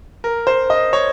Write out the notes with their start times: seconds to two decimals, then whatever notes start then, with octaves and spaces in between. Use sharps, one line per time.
0.24 A#4
0.47 C5
0.70 D#5
0.93 C#5